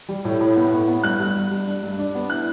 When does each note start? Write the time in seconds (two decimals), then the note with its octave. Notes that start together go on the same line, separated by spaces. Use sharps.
0.09 G3
0.25 A2
0.40 A2
0.56 B3
0.72 A2
0.88 B3
1.03 G2 F#6
1.19 G2
1.35 G2
1.51 G2
1.67 D4
1.83 G2
1.98 D4
2.15 B3
2.30 E4 F#6